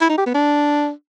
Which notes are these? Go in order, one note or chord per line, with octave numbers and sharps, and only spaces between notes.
E4
D#4
G4
B3
D4